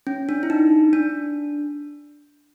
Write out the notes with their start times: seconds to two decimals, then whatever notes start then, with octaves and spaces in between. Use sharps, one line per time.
0.07 C#4
0.29 D4
0.43 E4
0.50 D#4
0.93 D4